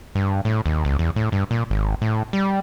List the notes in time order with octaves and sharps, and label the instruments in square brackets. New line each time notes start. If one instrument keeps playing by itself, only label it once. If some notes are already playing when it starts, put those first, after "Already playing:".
[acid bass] G2
A2
D#2
C#2
E2
A2
G2
A#2
G#1
A2
G3